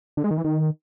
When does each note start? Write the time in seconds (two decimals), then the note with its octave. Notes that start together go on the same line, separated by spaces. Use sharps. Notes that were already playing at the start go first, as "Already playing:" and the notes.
0.17 D3
0.24 G#3
0.31 D#3
0.38 E3
0.44 D#3